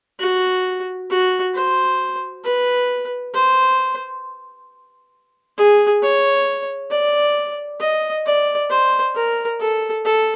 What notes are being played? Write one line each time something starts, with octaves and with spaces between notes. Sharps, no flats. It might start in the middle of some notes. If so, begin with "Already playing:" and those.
F#4
F#4
C5
B4
C5
G#4
C#5
D5
D#5
D5
C5
A#4
A4
A4